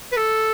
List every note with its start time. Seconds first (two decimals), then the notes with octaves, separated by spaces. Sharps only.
0.12 B4
0.16 A4